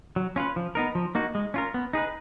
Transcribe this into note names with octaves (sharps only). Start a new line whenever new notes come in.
F#3
C#4 F4 B4
F3
B3 D#4 A#4
F3
A#3 D#4 F#4
G#3
C#4 F4 A#4
B3
D#4 G#4 B4